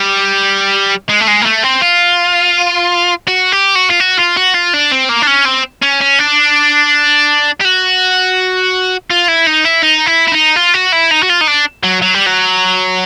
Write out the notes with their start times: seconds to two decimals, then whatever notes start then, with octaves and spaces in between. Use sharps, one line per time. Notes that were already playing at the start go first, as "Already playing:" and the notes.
Already playing: G3
1.09 G#3
1.20 A3
1.27 G#3
1.41 A#3
1.45 A3
1.63 C4
1.81 F4
3.28 F#4
3.52 G4
3.75 F#4
3.90 F4
4.00 F#4
4.19 F4
4.37 F#4
4.54 F4
4.74 D4
4.92 C4
5.09 A#3
5.22 D4
5.27 C#4
5.45 C4
5.82 C#4
6.01 C#4
6.19 D4
7.61 G4
7.65 F#4
9.10 F4
9.28 E4
9.47 D#4
9.65 E4
9.83 D#4
10.07 E4
10.28 E4
10.32 D#4
10.56 F4
10.74 F#4
10.93 E4
11.11 D#4
11.23 F#4
11.29 F4
11.41 D#4
11.47 D4
11.83 F#3
12.02 F#3
12.14 G3
12.26 F#3